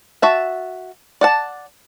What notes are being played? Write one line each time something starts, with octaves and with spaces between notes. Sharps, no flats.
F#4 E5 A5
D5 F#5 A5